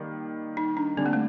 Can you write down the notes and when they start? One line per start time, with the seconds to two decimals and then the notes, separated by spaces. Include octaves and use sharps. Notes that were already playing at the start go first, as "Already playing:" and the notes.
Already playing: D#3 G3 A#3
0.57 D#4
0.77 D4
0.97 D3 G3 C4 D4
1.06 A#3
1.13 A3